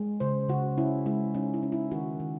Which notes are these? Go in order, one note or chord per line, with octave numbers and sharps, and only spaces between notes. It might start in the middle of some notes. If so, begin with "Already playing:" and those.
Already playing: G#3
C#3 C5
C#3 F#4
C#4 E4
G#3 E4
C#4 D#4
E4
C#4
E4
D#3 F#4
D#3